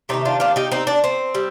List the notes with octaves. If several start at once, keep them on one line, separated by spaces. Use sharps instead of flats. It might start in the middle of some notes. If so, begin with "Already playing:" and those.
C3 D#3 A3 C4 D#4
D4 F4
D4 F4
D#4 G4
C4 D#4
D4
C4
G3